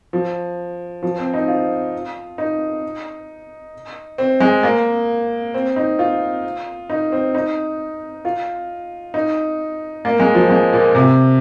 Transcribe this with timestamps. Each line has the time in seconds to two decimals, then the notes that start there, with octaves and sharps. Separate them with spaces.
0.13 F3
1.02 F3
1.18 C4
1.34 D#4
1.48 F4
2.38 D#4
4.18 C4
4.40 G#3
4.63 A#3
5.54 C4
5.76 D#4
5.99 F4
6.90 D#4
7.12 C4
7.35 D#4
8.25 F4
9.14 D#4
10.05 A#3
10.20 G#3
10.35 F3
10.50 G#3
10.73 A#2
10.95 C3